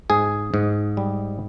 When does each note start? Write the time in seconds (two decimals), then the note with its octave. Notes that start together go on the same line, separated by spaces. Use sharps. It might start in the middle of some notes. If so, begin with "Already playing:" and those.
0.10 G#2 G#4
0.54 G#2
0.97 G3